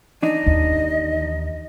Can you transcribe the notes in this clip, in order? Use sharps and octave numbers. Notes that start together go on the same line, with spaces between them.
E3 D4 D#4 D#5
D#2